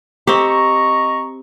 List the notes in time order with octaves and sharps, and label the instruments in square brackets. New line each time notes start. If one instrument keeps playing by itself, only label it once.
[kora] C4 G4 [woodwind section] D#5 A#5 C#6